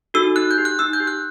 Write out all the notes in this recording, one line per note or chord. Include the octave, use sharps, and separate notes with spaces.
D#4 F#4 A4 E6
D#4 F#6
G6
G4
F#6
D#4 E6
G6
G4
F#6